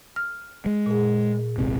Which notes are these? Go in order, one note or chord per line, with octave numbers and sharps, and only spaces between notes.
F6
G#3
A#2 G#4
D#1 G#1 C3